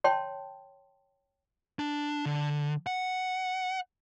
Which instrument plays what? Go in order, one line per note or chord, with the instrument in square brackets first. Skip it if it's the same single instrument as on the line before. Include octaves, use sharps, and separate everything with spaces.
[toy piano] C#5 G5 A5 C6
[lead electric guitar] D4
D3
F#5